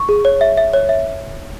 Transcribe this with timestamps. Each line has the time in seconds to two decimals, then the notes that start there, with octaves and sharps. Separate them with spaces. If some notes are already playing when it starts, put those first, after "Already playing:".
Already playing: C#6
0.09 G#4
0.25 C#5
0.41 E5
0.57 E5
0.73 C#5
0.89 E5